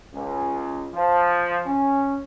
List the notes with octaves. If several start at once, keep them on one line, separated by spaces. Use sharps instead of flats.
C#2
F3
C#4